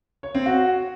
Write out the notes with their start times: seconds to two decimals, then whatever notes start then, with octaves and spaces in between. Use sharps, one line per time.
0.23 C#5
0.35 C4
0.46 F#4